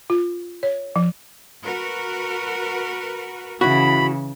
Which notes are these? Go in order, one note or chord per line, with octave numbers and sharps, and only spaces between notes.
F4
C#5
F3
F#4 A#4 B4
C#3 E3 E4 F#4 B5